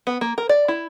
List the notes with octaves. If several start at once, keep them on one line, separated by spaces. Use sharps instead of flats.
B3
A#3
A#4
D5
E4